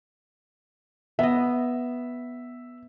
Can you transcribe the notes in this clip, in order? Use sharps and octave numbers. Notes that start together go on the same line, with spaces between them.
B3 D#5 E5